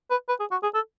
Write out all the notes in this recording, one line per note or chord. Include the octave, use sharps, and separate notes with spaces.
B4
B4
G#4
F#4
G#4
A4